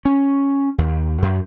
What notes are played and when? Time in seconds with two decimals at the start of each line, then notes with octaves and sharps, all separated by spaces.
0.05 C#4
0.78 D#2
1.22 F#2